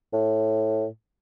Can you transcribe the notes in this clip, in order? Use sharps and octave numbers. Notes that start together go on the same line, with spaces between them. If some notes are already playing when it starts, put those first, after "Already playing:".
A2